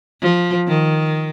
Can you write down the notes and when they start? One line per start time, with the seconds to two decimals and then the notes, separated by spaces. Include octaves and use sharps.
0.22 F3
0.68 D#3